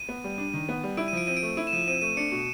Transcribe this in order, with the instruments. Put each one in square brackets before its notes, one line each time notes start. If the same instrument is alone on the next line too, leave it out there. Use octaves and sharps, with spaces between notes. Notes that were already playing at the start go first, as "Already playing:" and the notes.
Already playing: [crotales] D#7
[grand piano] B3
G3
D4
D#3
B3
G3
[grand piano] E4 [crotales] D7
[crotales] D#7
[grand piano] F3 [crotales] D7
[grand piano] C4 [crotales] D#7
[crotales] D7
[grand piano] A3
[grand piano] E4 [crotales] D7
[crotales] E7
[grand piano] F3 [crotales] D#7
[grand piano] C4 [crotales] D#7
[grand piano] A3 [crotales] D#7
[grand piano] D4 [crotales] C#7
[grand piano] B2